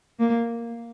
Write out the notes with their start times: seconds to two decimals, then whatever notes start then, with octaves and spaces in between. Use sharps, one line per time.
0.20 A#3